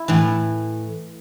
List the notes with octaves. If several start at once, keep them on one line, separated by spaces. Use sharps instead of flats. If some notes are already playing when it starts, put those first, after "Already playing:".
Already playing: E4
A2 E3